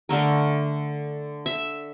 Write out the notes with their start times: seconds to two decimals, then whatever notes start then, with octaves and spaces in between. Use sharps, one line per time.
0.09 D3 A3 A#4
1.46 E5